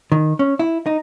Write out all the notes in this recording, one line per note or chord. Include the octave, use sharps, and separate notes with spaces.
D#3
C#4
E4
D#4